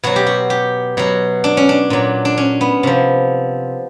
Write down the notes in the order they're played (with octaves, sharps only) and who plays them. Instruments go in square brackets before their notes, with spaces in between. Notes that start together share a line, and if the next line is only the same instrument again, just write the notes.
[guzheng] B2 F#3 F#4
G4
F#4
G4
B2 F#3 F#4
D4
C#4
D4
A#2 F#3
D4
C#4
B3
C3 F3